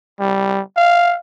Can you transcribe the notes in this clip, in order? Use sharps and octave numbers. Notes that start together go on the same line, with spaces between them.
G3
F5